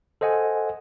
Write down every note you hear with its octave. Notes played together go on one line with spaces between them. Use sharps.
A4 C5 D#5 F#5 G#5